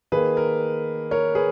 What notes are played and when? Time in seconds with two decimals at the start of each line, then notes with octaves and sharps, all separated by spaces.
0.12 D#3 A#3 G#4 B4
0.37 A#4
1.11 A#4 C#5
1.35 G#4 B4